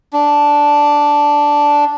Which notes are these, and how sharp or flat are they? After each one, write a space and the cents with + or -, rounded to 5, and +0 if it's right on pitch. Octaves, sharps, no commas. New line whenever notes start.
D4 -5